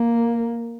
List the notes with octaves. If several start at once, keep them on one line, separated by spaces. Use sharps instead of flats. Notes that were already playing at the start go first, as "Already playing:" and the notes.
Already playing: A#3